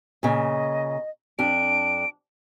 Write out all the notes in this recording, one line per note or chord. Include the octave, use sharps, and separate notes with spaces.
A#2 C#3 D#5
F2 D4 D7